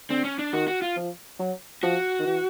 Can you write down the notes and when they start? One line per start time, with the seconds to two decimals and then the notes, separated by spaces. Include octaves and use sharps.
0.09 D3 C4
0.24 C#4
0.39 D4
0.53 D#3 F#4
0.68 F#4
0.82 F4
0.96 F3
1.39 F#3
1.83 F3 F#4
2.19 D#3
2.26 E3